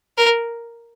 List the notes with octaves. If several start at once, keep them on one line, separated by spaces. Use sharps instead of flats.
A#4